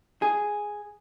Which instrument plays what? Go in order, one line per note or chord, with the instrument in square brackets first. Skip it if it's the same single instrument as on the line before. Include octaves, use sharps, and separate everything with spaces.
[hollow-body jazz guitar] G#4